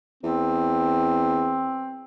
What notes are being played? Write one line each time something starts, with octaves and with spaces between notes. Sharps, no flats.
E2 C4